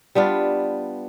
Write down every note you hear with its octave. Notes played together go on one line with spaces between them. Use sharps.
G3 B3 D4 F4